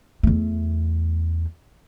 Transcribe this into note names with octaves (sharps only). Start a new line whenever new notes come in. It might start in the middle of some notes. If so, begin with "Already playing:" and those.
E2 A3